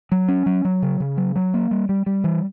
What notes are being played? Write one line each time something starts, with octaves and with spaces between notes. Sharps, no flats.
F#3
C#4
F#3
F#3
C#3
C#3
F#3
F#3
A#3
G3
G3
G3
E3